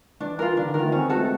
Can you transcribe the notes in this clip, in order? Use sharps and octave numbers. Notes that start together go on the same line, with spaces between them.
E3 D4
E3 F4 A#4
D#3 D4
D3
D#3 A#4
A3 F4
C4 C#4
B3
G#3 F#4 A4
A3